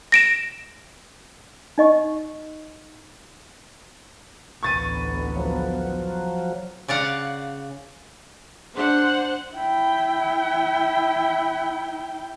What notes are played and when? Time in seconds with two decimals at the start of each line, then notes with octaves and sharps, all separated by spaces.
0.12 A#6 D7 E7
1.78 D#4 D#5 C#6
4.63 A1 D2 B3 C#6 A6 D#7
5.37 F3 F#3
6.88 C#3 D5 F5 F#5
8.75 D4 C5 F#5
9.54 E4 G5